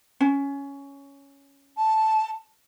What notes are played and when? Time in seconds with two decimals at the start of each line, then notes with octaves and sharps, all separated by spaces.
0.21 C#4
1.77 A5